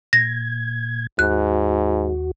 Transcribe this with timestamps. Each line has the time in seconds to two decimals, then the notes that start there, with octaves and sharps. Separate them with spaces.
0.13 A#2 G#6 A#6
1.19 D#2 G#2 F#4 F#6